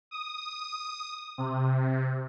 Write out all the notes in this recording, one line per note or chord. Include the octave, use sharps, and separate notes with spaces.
D#6
C3